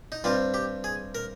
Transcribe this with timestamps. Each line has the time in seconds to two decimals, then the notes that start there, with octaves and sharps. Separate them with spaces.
0.12 D#4
0.24 G2 G3 C4 F4
0.54 G4
0.84 G#4
1.15 A#4